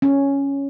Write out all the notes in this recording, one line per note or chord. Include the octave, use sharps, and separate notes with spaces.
C#4